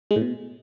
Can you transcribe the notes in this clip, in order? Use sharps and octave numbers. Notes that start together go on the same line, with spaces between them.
G#3
A2
B2